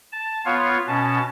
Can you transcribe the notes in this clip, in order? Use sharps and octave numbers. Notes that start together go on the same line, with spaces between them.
A5
B3 F4 C#5 F5
B2 C#4 A5